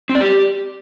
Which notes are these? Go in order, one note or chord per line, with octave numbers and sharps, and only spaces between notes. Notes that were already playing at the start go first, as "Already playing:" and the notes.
C4
D5
G4